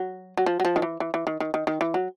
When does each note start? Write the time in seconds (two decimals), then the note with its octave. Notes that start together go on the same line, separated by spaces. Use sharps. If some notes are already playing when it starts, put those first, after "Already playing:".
Already playing: F#3
0.37 F#3
0.46 F3
0.60 F#3
0.65 F3
0.76 D#3
0.82 E3
1.00 E3
1.14 E3
1.27 D#3
1.40 D#3
1.54 D#3
1.67 D#3
1.81 E3
1.94 F#3